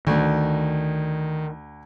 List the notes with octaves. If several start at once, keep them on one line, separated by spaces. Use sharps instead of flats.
D2 D#3